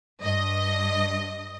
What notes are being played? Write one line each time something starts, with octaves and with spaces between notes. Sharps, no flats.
G2 D#5